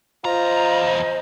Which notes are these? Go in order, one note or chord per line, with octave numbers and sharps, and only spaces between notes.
E2 F4 C5 D#5 A#5